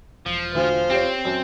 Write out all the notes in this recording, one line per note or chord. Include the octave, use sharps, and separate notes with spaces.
E1 F3
D2 F4 C5
C4 G4 C#5
F#2